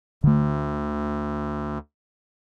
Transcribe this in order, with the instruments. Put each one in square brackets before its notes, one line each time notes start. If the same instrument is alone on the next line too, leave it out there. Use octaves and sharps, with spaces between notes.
[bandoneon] D2 [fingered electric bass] D3 A3